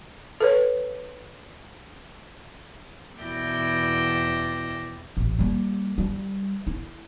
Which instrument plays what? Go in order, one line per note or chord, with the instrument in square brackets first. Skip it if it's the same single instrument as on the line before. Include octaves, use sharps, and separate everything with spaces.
[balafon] A4 B4 C#5
[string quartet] E2 B2 E4 D5 G5 A#6
[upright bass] A1
G3 A#3
G3
E4